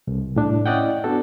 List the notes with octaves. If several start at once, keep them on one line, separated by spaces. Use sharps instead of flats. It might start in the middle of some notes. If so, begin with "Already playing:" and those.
C2
A2 D4
C#4 E4 D5 D#5 F#5 G5
B3 D4 F#4 A4